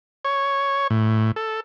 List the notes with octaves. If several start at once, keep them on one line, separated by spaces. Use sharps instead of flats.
C#5
A2
A4